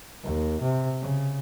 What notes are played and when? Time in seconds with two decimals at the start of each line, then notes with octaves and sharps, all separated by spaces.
0.24 D#2
0.61 C3
1.01 C#3